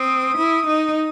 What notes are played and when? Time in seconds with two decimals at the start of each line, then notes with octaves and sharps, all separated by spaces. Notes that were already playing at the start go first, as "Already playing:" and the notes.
Already playing: C4 D#6
0.37 E4
0.66 D#4
0.96 D#6